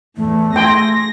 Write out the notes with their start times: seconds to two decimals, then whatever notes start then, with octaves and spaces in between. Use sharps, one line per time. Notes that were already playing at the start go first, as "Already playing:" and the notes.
0.17 E2 A2 A3
0.56 G#4 G5 G#5 C6 A#6